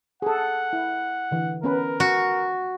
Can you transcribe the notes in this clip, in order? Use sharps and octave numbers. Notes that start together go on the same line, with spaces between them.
G#4 A4 F#5
E4
D3 E3
B3 C#4 A#4 B4
F#4